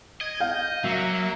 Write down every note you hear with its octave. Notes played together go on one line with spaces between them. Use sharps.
D#5 G#6
F5 G6
F#3 A#3 E5